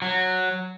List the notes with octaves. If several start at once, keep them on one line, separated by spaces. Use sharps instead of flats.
F#3